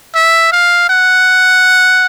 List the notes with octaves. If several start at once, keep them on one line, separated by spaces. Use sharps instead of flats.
E5
F5
F#5